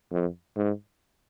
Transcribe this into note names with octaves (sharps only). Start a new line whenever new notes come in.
F2
G#2